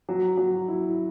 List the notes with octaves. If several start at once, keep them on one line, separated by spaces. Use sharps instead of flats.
F#3
F#3
E4